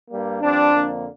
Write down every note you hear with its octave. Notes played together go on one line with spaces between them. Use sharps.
G2 G3 A#3
G2 F3 C4 D4
F2 D3 A#3